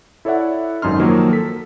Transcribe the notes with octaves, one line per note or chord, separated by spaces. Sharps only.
E4 A4 C#5 D5 E5 F#5
G#1 F#2 D#4 C6 F6
D#3 F3 F#3 A#3
A4 B6